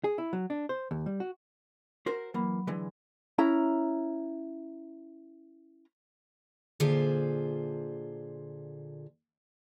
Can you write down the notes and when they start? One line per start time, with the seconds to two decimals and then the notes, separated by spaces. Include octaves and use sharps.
0.04 G#4
0.18 E4
0.33 F#3
0.50 D4
0.69 C5
0.91 D#2
1.06 G3
1.20 F#4
2.06 F#4 A#4 C5
2.34 E3 F#3 A#3 B5
2.67 D3 E3 G#3
3.38 C#4 E4 A#5
6.80 A#2 D3 F4 G#4 C5 E5